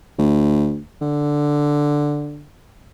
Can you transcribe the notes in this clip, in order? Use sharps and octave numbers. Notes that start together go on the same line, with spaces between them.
D2
D3